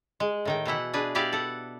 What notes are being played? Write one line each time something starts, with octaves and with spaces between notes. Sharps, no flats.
G#3
A2 D#3 G5
B2 E3 E4 F#5
D4 G#4 B4
B3 E4 G4 B4 D5 F5
A4 F#5